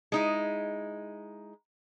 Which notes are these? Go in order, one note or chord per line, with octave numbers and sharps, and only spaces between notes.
G#3 D#4 E4